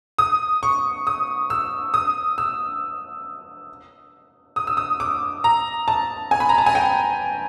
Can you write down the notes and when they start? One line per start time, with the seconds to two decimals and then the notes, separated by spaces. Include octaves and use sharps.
0.18 D#6
0.63 C#6
1.07 D#6
1.50 E6
1.94 D#6
2.38 E6
4.56 D#6
4.67 E6
4.77 D#6
5.00 D6
5.44 A#5
5.88 A5
6.31 G#5
6.40 B5
6.49 A#5
6.58 A5
6.66 G#5
6.75 G5